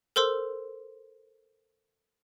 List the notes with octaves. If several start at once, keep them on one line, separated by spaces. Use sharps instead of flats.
A4 A#4 C5 C6 E6